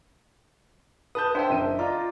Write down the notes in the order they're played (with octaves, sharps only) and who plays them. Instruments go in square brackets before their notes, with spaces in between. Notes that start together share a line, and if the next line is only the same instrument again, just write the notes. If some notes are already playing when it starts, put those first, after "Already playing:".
[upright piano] B4 A5 G6 [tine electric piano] D#6
[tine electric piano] D4 E5 [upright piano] C5 G5
[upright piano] F#1 D#7
[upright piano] F4 D5 D#5 [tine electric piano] A#5